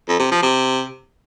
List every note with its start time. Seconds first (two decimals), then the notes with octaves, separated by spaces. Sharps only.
0.08 F2
0.20 C3
0.31 F3
0.42 C3